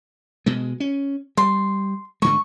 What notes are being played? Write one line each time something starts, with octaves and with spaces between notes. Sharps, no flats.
B2 G#3
C#4
G3 C6
G#2 D3 G#3 C#6